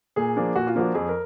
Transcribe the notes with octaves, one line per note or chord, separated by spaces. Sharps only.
A#2 G#4
F3 A#3 D4
A#2 F#4
F4
F3 A#3 D4 F#4
F2 G#4
A#4